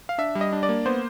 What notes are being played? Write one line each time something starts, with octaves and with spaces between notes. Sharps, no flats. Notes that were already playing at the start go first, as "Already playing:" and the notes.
F5
D4 E5
G3
D#5
D4
D5
A#3
B3 C5